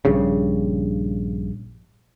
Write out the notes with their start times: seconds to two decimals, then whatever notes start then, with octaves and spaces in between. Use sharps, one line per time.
0.05 A#1 G2 C#3